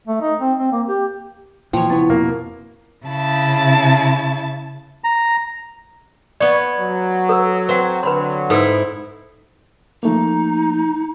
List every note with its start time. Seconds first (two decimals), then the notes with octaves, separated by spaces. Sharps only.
0.07 A3
0.21 D#4
0.40 C4
0.59 C4
0.72 A#3
0.88 G4
1.73 A#2 E3 F3 C#5 G5
1.90 C#3 B3 E4
2.10 F2 B2 A#3
3.05 C#3 E4 A5
5.04 A#5
6.40 B3 C#5 D5 C#6
6.79 F#3
7.29 A4 B4 E6
7.69 C4 B4 F#5
8.03 D3 F#3 B4 B5 C6
8.50 G#2 D#4 E4 A4 B4
10.03 F3 A3 A#3 D#4